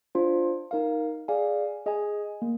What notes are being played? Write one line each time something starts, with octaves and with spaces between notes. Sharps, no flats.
D4 F4 C5
D#4 A#4 F5
G#4 D5 F5 G#5
G#4 D#5 G#5
A#3